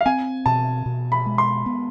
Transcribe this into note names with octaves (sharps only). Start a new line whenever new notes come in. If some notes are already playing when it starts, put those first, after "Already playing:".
F5
C4 G#5
B2 A5
B2
B5
G#3
C6
B3